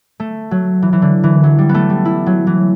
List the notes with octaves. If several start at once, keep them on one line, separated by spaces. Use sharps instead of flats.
A3
F#3
E3
E3
D3
E3
F#3
G3
B3
A3
G3
E4
F#3
E3